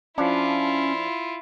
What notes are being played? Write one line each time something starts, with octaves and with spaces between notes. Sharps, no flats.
F3 C#4 D4 E4 F4